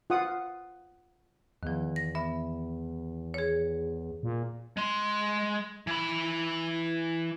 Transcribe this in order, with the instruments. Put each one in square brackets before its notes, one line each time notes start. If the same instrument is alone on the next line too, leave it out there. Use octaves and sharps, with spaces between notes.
[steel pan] F4 F#5 D#6
[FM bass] E2 [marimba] D#3 F3
[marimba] A#6
B3 E5
G#4 C#5
[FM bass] A#2
[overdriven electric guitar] G#3 C6
E3 B5